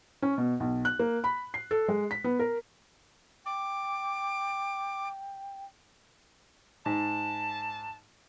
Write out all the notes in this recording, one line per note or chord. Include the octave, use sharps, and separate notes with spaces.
C#4
B2
B1
F#6
A#3
B5
C7
A4
G#3
B6
B3
A#4
G5 D6
G#2 A5